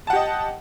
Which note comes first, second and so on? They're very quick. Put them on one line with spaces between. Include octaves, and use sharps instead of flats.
A5 F#5 G4 D#5